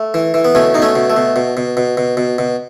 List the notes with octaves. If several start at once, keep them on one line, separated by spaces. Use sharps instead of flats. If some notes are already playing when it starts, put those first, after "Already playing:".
Already playing: A3
E3
E3
B3
B2 A3 C#4
B2 D#4
A3 C#4
B2
A3
B2
B2
B2
B2
B2
B2
B2